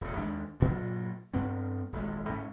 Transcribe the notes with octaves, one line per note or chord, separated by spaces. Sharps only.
D#1 A2
D#2 G#3 D4
G2 A#2 F#3
G2 B3 C4
D#1 G#1 G#3
G#2 C#4